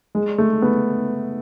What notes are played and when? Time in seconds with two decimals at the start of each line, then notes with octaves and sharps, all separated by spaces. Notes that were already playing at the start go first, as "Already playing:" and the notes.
0.15 G#3
0.38 A3
0.62 B3